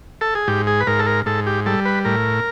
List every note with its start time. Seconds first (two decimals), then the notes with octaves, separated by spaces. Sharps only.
0.21 A4
0.35 G#4
0.47 G#2 G4
0.67 G#4
0.80 B4
0.87 G#2 A#4
0.99 A4
1.07 A#4
1.26 G#2 A4
1.47 G4
1.66 G3 A4
1.85 B4
2.05 A2 A#4